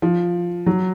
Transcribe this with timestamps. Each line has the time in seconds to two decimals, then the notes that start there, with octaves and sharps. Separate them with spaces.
0.02 F3
0.66 F#3